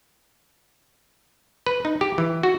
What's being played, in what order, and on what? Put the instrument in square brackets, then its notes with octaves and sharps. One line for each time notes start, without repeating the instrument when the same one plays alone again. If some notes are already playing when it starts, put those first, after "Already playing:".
[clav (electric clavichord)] B4
D#4
G4
E3
F#4